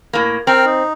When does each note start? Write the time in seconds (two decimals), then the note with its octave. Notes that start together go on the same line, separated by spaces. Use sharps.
0.13 A2 A#3
0.47 C4 A#4 G5 F6
0.65 D#4